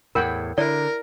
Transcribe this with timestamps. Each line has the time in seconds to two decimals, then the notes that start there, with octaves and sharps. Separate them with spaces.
0.15 E2 A2 A#4 F#5 G5 B5
0.58 D3 E4 A#4 D5